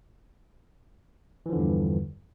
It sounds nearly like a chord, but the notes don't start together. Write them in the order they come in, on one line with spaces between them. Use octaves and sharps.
E3 F3 D3 E2 G2